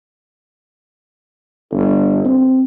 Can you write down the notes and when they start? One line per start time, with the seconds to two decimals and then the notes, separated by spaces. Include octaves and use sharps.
1.71 G1
2.25 C4